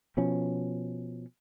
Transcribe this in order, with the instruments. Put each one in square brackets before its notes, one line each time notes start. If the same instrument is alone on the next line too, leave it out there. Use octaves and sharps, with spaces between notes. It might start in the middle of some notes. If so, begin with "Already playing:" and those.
[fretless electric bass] B2 F3 C#4